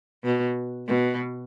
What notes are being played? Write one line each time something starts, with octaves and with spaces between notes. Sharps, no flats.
B2
B2